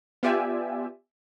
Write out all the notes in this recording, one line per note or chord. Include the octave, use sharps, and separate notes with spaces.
B3 F4 G4 D5 E5 G#5